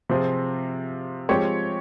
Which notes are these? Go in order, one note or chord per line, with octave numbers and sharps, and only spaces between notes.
C3 F3 C4 F4 G#4
F3 G#3 C4 G4 C#5